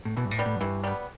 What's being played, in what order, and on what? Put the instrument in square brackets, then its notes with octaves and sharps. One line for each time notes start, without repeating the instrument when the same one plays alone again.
[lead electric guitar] A2
[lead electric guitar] B2 [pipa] E3
[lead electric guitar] G2
A2
[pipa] G3 B3
[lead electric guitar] A2
F#2
[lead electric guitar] G2 [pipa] E3
[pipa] G3 B3